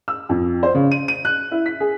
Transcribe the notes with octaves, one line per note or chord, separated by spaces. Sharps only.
E6
F2
C5
C#3
D#7
D#7
F#6
E4
B6
G#4